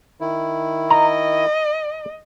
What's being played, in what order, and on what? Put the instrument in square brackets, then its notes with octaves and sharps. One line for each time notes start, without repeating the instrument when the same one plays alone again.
[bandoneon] D#3 E4
[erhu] D#5 [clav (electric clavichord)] A#5